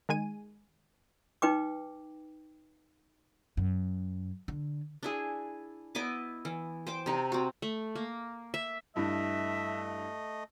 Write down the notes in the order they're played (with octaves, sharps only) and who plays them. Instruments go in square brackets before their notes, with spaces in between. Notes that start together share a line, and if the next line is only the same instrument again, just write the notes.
[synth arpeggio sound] D#3 G#3 G#5 D#7
[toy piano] D#4 B4 G5 D6
[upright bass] F#2
D3
[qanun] D4 E4 G#4
B3 E4 D#5 D6
E3
C5 G5 D6
C3 D#4
C4 F#4
A3
A#3
E5
[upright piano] G2 E4 [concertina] A3 D#5 [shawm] E5